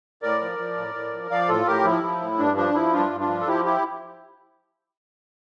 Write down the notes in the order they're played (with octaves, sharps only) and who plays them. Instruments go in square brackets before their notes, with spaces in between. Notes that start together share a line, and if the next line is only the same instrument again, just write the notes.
[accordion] A2 A#4 D5
F3
F3
A2
A2
F3
F3 D5 F5
A2 F4 A4
A2 G4 A#4
F3 E4
F3
A2
G2 D4
F3 D4
F3 E4
G2 D4 F4
G2
D4 F4
F3
A4
F3 E4 G4
E4 G4